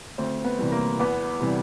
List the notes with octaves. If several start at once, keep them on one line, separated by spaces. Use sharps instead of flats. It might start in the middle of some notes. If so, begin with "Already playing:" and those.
D2 C4
B3
C3 E3 G3
A#3
E2 B3
C3 E3 G3